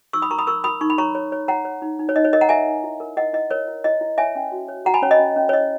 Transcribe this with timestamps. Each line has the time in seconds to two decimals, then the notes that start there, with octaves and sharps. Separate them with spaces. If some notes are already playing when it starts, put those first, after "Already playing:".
0.13 D#4 C#6 E6
0.22 B5 D#6
0.30 A#4 A#5 C#6
0.38 B5 D#6
0.47 A#4 C#6 E6
0.64 A#4 B5 D#6
0.81 D#4 C#6
0.90 B5
0.98 C#5 A#5 C#6
1.15 C#5
1.32 C#5
1.48 C#5 F#5 A#5
1.65 C#5
1.82 D#4
1.99 D#4
2.09 C#5
2.16 D#4 D#5
2.25 C#5
2.33 A#4 D#5
2.41 F#5 A#5
2.49 A#4 E5 G#5
2.66 D#4
2.84 E4
3.00 A#4
3.17 E4 D#5 F#5
3.33 E4 D#5
3.50 A#4 C#5
3.67 E4
3.84 E4 D#5
4.01 E4
4.18 C#5 E5 G#5
4.35 C#4
4.52 F#4
4.68 C#5
4.85 F#4 F#5 A#5
4.94 G#5 B5
5.02 C#4 C#5
5.11 D#5
5.20 C#4
5.36 C#4
5.49 C#5
5.53 E4 D#5